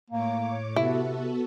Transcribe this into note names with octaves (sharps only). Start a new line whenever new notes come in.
A2 A#3 C#5 D6
C3 B3 E4 F#4 A4